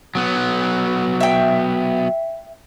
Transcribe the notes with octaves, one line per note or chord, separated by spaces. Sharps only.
F#3 B3
E5 G5